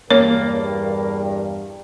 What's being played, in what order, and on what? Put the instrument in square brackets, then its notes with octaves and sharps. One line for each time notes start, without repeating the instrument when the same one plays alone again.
[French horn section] E2 G2 A#4 [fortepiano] A#3 [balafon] C#5